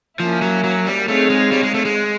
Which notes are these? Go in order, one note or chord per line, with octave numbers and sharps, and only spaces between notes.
F3 A#3 C#4 E4
F#3
F#3
G3
A3 C4 D#4 G#4 C#5 F5
G#3
G3
G#3
A3
G#3